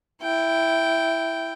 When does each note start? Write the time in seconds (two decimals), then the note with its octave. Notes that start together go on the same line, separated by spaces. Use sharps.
0.22 E4 G5